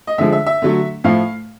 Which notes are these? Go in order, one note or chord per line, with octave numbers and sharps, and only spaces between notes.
D#5
D3 F3 G#3 E5
E5
E5
D3 F#3 A3
A2 F3 A3 F5